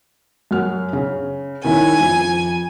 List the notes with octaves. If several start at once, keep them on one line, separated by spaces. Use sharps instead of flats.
F#2 F#5 F6
C#3
D#3 C#4 E4 G#5
F2 F3